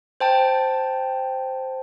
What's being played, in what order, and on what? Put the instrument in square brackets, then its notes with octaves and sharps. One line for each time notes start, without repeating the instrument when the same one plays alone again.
[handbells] C5 G5 A5